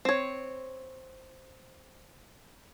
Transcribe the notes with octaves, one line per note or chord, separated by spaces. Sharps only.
C4 C#5